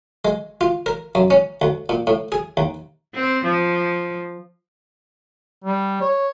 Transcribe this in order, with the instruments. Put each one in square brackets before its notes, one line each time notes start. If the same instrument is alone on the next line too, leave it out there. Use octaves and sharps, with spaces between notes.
[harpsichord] G#3
F4
A#4
F#2
C#4
D2
A#2
A2
G#4
D#2
[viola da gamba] C4
F3
[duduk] G3
C#5